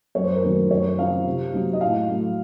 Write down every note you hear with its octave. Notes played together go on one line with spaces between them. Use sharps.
F#2 C#5
C5
A#4
D#3 F#3 A3 D#4 C5
F#2 C#5
C#3 F3 C4 D#4 F5
C3
F#3 A#3 D#4
D#5
A2 F5
F#3 A3